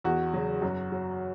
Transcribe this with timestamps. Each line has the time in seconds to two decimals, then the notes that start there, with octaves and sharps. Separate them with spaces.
0.04 E2 F#4
0.34 C#3 F#3
0.62 F#2
0.92 F#3